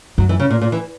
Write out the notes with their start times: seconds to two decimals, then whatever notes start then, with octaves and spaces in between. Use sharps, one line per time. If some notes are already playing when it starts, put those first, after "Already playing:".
0.18 F#2 F#3
0.29 E3
0.40 C#3
0.50 A#2
0.61 A#2
0.72 E3